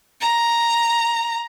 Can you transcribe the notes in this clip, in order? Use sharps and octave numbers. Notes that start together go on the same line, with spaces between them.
A#5